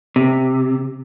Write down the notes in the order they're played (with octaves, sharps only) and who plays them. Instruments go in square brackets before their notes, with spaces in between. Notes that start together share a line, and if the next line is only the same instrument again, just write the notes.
[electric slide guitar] C3